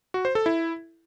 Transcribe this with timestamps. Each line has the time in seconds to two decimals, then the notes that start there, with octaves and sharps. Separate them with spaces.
0.14 F#4
0.25 C5
0.35 A4
0.46 E4